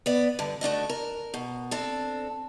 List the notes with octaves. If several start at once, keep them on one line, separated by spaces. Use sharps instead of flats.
B3 D5
G2 D3
A3 D4 F#4 D#5
A#4
B2
C4 D4 A4